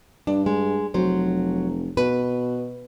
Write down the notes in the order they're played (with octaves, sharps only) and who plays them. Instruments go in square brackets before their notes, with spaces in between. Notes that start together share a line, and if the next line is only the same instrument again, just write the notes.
[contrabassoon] G2 [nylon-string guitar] D4
[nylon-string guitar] G#3
[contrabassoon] F1 [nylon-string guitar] F#3 C5
[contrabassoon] B2 [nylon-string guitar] B4